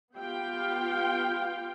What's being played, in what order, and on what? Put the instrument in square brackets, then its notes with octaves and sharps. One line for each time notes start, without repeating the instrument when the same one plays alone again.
[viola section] B3 F4 G4 F5 G5